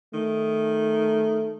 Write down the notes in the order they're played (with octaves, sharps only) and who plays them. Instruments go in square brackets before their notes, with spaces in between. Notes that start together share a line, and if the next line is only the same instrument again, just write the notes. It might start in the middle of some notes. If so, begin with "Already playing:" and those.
[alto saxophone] D#3 [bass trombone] A3